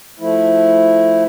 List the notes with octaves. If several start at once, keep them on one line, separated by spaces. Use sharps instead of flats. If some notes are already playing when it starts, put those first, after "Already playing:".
F3 A3 E4